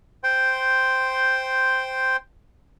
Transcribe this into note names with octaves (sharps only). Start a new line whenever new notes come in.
C5 G5 C6